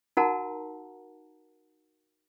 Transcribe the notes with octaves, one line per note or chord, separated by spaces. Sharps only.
D#4 F#4 A#4 F#5 A5 A#5